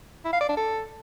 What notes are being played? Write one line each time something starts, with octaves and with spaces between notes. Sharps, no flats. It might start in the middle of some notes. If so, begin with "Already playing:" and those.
E4
F5
D5
D4
A4